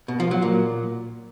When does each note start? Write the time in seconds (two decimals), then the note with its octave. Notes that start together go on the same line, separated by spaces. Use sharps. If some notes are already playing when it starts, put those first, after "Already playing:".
0.08 B2
0.20 F3
0.31 F#3
0.42 A#2